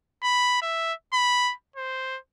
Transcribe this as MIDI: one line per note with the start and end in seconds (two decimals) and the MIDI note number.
0.23 0.59 83
0.62 0.93 76
1.13 1.54 83
1.76 2.18 72